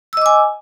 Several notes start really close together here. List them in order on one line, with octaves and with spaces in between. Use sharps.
E6 D#5 D6 G#5